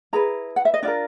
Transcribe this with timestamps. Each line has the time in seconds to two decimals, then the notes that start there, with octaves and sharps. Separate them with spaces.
0.13 E4 G#4 B4 A#5
0.56 F#5
0.65 E5
0.74 D#5
0.83 D4 F4 A#4 D5